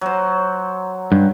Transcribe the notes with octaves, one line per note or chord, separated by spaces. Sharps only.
F#3 C5
G2